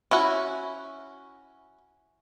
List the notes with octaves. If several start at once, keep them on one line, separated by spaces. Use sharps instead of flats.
C#4 E4 F#4